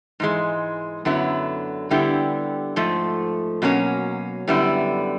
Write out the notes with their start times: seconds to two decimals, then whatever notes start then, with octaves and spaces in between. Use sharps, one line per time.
0.20 G#2 E3 G#3
1.05 F#2 D3 F#3 B3 E4
1.90 D3 G3 B3 E4 G4
2.76 G#2 F3 A3
3.62 B2 F#3 A#3 C#4
4.48 F#2 D3 G3 B3 E4